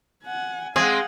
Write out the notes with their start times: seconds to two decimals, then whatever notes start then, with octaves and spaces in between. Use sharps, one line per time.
0.24 F#5 G#5
0.76 G#3 C4 G#4 F5 F#5